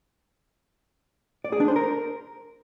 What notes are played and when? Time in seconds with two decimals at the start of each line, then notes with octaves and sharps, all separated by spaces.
1.44 D5
1.52 G#4
1.60 D4
1.68 C5
1.76 A#4